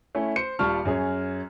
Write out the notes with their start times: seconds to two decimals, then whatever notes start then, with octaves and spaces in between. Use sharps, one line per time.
0.15 A3 C#4 E4
0.36 C5 C#7
0.59 D#1 G3 F4 A5 C#6 F6
0.85 F#2 C#4 G#4 C#5